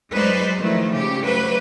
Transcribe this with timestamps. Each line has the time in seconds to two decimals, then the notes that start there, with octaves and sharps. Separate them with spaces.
0.12 F#3 G#3 D#4 B4 C5 D5
0.58 D#3 F3 A3 E4
0.93 C#3 G4
1.23 F#3 A3 B4 C5